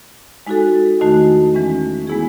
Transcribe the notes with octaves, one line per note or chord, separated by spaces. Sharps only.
G#3 D#4 F#4 A4
E2 D#3 A3 D#4 F#4
E3 G#3 C#4
G#3 B3 E4 G#4